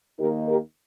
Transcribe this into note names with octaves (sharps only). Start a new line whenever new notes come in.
D#2 D#3 A#3 D#4 G4 A#4
G4 A#4